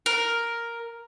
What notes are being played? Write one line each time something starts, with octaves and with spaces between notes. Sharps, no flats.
A#4